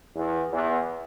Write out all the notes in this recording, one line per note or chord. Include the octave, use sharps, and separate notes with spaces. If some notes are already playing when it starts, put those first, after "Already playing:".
E2
E2